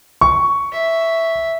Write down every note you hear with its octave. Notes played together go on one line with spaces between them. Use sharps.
C#6
E5